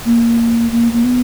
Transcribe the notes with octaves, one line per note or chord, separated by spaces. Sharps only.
A#3
A#3
A#3
B3